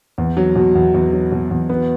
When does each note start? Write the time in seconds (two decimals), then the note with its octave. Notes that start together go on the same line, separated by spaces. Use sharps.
0.18 E2
0.37 F#3
0.56 B2
0.75 E2
0.94 E2
1.13 F#3
1.32 B2
1.51 E2
1.69 B3